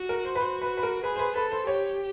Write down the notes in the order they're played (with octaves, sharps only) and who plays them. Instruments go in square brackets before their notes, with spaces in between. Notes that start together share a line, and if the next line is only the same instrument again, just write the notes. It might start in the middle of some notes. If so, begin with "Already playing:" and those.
Already playing: [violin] F#4
[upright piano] A#4
C5
B4
[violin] F#4 [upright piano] C5
[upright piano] B4
B4
A#4
[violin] G#4 [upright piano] B4
[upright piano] C5
B4
[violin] A4 [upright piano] B4
[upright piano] C5
[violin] G4 [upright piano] C#5